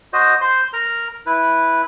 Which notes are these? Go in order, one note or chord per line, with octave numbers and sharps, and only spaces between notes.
F#4 C5 D#5
C5 C6
A#4 A#5
E4 B4